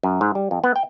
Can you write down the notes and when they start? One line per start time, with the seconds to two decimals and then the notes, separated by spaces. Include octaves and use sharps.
0.03 F#2
0.21 G#2
0.35 G3
0.51 F2
0.64 B3
0.76 G5